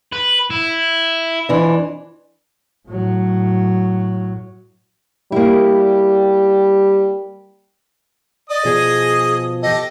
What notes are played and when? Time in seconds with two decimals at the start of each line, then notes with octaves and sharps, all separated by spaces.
0.12 B4
0.50 E4
1.49 F2 E3 D4
2.88 A2 F#3
5.32 G3 A#3 E4
8.50 D5 D#5 D#6
8.65 B2 F3 G#4
9.63 G4 A4 D#5